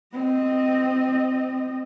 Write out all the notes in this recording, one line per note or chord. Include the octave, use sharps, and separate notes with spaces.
C4 D#5